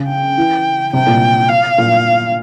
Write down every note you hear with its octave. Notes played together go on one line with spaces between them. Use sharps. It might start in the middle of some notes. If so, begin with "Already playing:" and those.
Already playing: C#3
G5
E3
C3 G5
A#2
F5
A#2